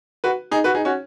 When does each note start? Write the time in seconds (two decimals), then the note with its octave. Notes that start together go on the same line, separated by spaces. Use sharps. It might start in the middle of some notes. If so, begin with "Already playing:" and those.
0.24 F#4 B4
0.51 D#4 G#4
0.64 F#4 B4
0.74 D#4 G#4
0.85 C#4 F#4